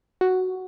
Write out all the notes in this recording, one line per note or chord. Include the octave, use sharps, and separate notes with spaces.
F#4